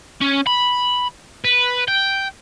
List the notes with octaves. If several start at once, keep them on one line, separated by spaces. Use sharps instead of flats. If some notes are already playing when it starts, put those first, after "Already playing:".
C#4
B5
B4
G5